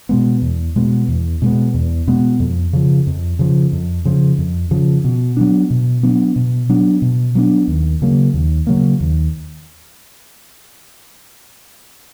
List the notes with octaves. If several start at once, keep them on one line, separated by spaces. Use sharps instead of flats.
B2 G#3 B3
E2
B2 G#3 B3
E2
B2 G#3 B3
E2
B2 G#3 B3
F2
C#3 F3
F2
C#3 F3
F2
C#3 F3
F2
C#3 F3
B2
F#3 B3 D4
B2
F#3 B3 D4
B2
F#3 B3 D4
B2
F#3 B3 D4
D#2
C#3 F#3 A#3
D#2
C#3 F#3 A#3
D#2